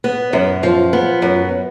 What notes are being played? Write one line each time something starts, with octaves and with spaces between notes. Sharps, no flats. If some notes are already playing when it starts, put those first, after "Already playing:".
B3
F#2
F3
B3
F#2